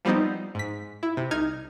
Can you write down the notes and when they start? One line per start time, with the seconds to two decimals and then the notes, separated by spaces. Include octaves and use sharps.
0.05 F3 G3 B3 C4 D#4
0.55 G#2 B6
1.03 E4
1.17 C3
1.31 C2 D#4 F6 G#6